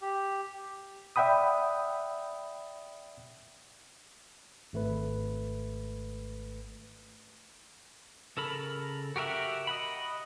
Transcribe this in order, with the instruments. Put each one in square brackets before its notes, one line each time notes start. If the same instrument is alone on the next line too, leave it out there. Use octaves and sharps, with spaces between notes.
[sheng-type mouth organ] G4
[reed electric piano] D5 E5 F#5 G5 B5 D#6
[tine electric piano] G#1 A3 B4
[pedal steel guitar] C#3 A4 A#4 B5
F#4 G4 A#4 E5 F#5
D#5 F#5 B5